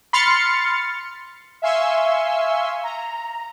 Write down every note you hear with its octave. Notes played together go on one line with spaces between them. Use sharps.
B5 C6 F6 A6 C#7
E5 F5 G#5 C6 C#6 E6
A#5